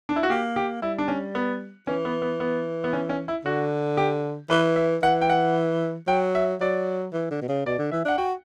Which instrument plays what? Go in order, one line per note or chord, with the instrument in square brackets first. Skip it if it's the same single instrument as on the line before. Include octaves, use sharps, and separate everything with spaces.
[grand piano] D4
E4
F#4
[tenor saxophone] A#3 [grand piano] G4
[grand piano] G4
[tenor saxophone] G3 [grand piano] E4
[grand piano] D4
C#4
B3
[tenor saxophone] E3 [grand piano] C#4
[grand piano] B3
B3
B3
B3
C#4
C#4
E4
[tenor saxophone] D3 [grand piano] F#4
[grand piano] G4
[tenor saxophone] E3 [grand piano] B4
[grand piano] E5
[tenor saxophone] E3 [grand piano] F#5
[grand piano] G5
F#5
[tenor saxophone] F#3 [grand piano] G5
[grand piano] E5
[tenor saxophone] F#3 [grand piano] D5
[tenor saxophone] E3
D3
B2
C#3
[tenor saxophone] B2 [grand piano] D5
[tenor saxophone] D3
[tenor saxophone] E3 [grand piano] E5
[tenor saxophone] D4 [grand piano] F#5
[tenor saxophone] F#4 [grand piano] G5